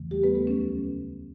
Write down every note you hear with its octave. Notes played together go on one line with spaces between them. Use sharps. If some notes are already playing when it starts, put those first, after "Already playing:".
Already playing: E2 C#3 E3 A3
G3 G4
B3 B4
A3 A4
D2 C#3 F#3 A3 C#4